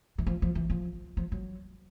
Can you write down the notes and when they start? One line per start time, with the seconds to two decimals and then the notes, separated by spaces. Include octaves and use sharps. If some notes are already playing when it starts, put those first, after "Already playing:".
0.18 E3
0.27 F3
0.42 F3
0.55 E3
0.70 F3
1.17 F3
1.32 F#3